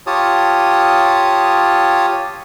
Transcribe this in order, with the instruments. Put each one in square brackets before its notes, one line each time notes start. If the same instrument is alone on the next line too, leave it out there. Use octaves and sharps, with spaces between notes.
[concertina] F4 G4 C#5 A5 D#6